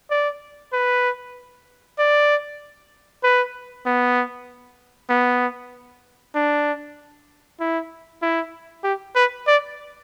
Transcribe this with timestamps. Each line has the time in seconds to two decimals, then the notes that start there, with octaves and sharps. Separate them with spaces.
0.10 D5
0.73 B4
1.98 D5
3.23 B4
3.86 B3
5.09 B3
6.35 D4
7.60 E4
8.22 E4
8.84 G4
9.15 B4
9.47 D5